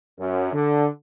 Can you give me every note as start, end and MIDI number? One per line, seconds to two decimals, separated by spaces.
0.19 0.50 42
0.53 0.87 50